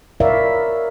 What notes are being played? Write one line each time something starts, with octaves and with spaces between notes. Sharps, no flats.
E4 A#4 C#5 D5 E5 F5